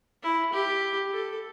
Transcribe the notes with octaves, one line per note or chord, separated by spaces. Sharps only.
E4
G4
A4